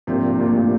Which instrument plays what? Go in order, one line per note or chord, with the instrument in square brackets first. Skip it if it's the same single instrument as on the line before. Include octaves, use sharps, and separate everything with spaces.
[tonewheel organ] G#2 F3 A#3 D4 G4 [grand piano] C3
[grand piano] A#2
A2